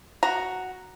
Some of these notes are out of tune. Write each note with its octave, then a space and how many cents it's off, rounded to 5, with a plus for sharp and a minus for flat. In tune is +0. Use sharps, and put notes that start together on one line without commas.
F#4 +0 A#5 +0